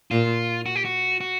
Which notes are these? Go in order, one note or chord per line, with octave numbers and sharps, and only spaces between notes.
A#2 F4
F#4
G4
F#4
F#4